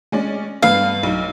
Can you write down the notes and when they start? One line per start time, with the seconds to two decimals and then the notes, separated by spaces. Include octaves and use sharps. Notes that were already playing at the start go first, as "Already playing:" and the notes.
0.12 G#3 C#4 D5
0.63 G2 B3 F5
1.03 B1 D#4